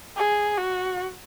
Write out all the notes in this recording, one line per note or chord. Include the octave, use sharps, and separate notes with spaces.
G#4
F#4